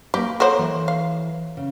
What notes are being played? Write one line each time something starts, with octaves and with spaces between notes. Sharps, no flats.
A#3 G4 B4 G5
F#4 A4 C5 C#5 A#5
E3
F5
C#3